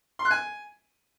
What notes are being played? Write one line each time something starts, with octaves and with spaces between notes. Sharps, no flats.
C6
F#6
G#5